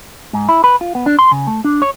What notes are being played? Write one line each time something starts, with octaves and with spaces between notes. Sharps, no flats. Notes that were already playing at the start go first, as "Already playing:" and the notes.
G#2
E4
B4
F4
B3
D4
C6
C#3
A3
D4
C#5